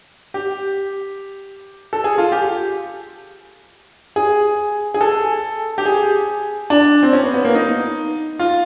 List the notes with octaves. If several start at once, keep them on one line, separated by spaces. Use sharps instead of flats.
G4
A4
G#4
F4
G4
G#4
G#4
A4
G4
G#4
D4
C4
C#4
B3
B3
A#3
D#4
F4